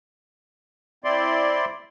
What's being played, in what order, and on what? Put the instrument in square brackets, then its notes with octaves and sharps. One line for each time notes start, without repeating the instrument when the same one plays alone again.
[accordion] C4 E4 D5 C6